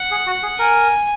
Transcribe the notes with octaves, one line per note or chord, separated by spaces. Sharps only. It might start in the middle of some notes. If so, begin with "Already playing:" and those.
Already playing: F#5
G#4
F#4
G#4
A#4 G#5